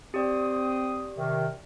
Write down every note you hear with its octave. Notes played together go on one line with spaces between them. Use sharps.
C4 G4 D5 D#6
C3 D#3